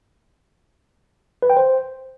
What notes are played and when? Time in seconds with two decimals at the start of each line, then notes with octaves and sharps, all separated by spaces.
1.42 B4
1.50 G5
1.57 C5